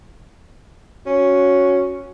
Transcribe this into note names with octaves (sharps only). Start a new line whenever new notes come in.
C#4 F#4